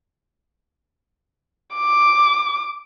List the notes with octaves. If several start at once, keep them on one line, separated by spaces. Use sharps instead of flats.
D6